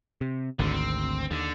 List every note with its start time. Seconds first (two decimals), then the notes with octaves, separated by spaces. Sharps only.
0.21 C3
0.59 G#1 D2 D3 C4
0.74 C4
1.31 D#2 D3